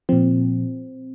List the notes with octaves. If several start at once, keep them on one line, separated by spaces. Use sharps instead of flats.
A#2 F3 C4